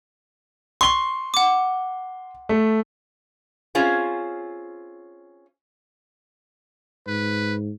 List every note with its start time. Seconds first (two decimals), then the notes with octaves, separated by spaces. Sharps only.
0.81 C6 C#6 G7
1.34 F#5 D6
2.49 A3
3.75 C4 C#4 F4 G#4 C5
7.07 G#2 B4